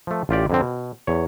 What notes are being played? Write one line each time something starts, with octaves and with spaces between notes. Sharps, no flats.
F3 A3
A1 F4 G4 D5
F2 D3 C4
B2
E2 C#5